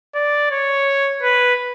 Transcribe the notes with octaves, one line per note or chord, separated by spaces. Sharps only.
D5
C#5
B4